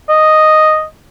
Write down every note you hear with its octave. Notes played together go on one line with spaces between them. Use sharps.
D#5